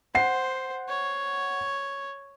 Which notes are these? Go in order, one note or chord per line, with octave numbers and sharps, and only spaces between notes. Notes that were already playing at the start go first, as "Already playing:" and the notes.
C5 F#5 C7
C#5